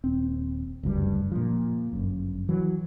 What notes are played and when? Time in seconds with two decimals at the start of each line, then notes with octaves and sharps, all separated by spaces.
0.04 D#1 C4
0.83 F#1 D2 G2 G3
1.32 A#2 F3
1.93 G1 F#2
2.49 E3 F#3